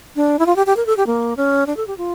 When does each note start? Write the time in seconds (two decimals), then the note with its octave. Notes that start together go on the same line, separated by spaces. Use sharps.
0.16 D4
0.39 E4
0.46 F4
0.56 G4
0.66 G4
0.77 A#4
0.86 A4
0.97 G4
1.07 A#3
1.37 C#4
1.67 D4
1.77 A4
1.87 G4
1.98 F4